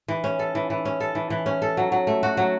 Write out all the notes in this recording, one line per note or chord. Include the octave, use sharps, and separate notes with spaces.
E3
C#4
A4
E3
E3
C#4
A4
E3
E3
C#4
A4
F#3
F#3
A3
F#4
F#3